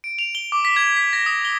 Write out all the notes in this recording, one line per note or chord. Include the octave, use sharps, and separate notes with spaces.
D7
F7
G7
D6
B6
G#6
B6
A#6
D#6
G7